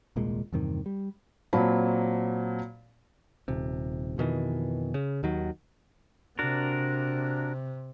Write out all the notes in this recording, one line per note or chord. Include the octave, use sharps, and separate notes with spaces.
D#1 C2 A#2 G#3
E2 G2 C3 D#3
G3
A#2 F#3 C4 A5 B5
D#1 C3
F2 B2 D#3 E3
C#3
D#2 D#3 F#3
C3 D4 F#4 A#4